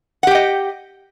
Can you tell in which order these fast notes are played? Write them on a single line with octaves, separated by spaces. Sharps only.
F#5 G4 G5 D#5